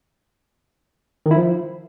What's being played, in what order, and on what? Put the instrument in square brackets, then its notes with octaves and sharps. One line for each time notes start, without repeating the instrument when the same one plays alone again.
[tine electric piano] D#3
E4
F3